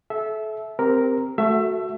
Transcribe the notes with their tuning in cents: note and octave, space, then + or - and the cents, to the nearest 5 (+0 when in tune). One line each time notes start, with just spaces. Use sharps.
A4 -30 E5 -5
C4 -5 G4 +0 A#4 +0
A3 -10 F#4 +0 E5 +25